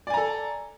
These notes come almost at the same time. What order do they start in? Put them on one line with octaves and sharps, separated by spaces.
D5 G#5 A#5 A4